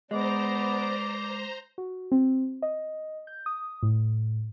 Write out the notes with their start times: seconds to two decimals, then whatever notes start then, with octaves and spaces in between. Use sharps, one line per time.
0.11 G#3 B3 B4 C5 D5 A#5 D6
1.78 F#4
2.12 C4
2.62 D#5
3.27 G6
3.46 D#6
3.83 A2